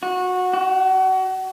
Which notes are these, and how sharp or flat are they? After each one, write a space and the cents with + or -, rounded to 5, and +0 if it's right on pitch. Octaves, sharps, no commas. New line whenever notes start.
F#4 -20
F#4 +30